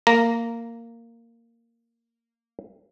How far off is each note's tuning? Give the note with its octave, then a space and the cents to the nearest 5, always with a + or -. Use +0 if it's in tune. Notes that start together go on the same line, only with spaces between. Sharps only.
A#3 -10 A#5 +0